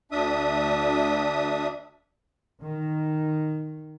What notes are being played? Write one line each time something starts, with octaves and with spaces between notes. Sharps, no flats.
D2 D4 E5 D#6
D#3